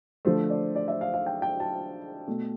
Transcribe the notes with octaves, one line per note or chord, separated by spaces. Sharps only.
D3 F3 A3 C5
D5
D5
E5
F5
F5
G5
G5
A5
B2 A3